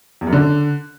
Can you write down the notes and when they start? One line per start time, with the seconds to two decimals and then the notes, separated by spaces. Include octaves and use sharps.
0.21 E2
0.27 F#2
0.33 D3